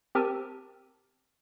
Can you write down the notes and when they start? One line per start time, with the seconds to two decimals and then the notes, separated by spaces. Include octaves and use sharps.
0.15 C4 G4 A#4 A5 E6 D#7